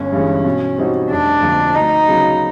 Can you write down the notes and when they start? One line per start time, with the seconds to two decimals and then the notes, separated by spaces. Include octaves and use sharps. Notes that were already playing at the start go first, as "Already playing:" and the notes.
Already playing: G1 C#4
0.12 G2 E3 G#3
0.45 B2
0.78 G3 C4 D#4 F#4
1.10 F1 D4
1.42 F2 D3 F3 A#3
1.75 D2 D#4
2.08 C#3 F#3 B3